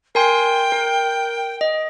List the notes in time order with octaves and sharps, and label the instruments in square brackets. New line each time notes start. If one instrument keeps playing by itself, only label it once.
[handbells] A#4 G#5 C6 [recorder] G5
[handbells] A#4
D#5